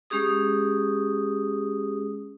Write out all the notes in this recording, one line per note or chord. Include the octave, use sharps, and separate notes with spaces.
G#3 C#4 G4 G#4 D#6